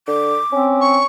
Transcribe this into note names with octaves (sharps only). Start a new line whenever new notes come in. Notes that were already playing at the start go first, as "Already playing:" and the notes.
D3 D6
C4 C#4
C#6